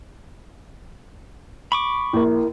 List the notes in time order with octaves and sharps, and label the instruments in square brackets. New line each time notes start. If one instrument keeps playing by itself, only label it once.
[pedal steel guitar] B5 C#6 D6
[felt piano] A#1 [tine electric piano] E4 A#4